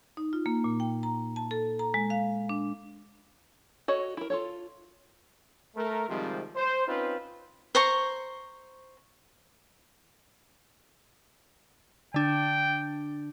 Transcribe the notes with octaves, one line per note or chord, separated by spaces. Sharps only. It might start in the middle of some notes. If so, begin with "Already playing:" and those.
D#4
F4
A#3
A#2
G5
A#5
A5
A4
A#5
G#3
F5
D4
F#4 A4 C#5 D#5
E4 A#4
F4 A4 C#5
A3 A#4
C3 D#3 F3 G3 G#3 C4
C5
C4 C#4 D#4 F4 B4
C5 A#5 C#6
D3 D4 G5